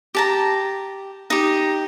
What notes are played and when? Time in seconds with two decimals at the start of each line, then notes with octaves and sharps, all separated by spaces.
0.15 G4 A5 A#5
1.30 D#4 G4